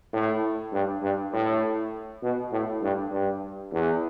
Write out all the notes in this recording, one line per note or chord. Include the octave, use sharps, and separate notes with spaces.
A2
G2
G2
A2
B2
A2
G2
G2
E2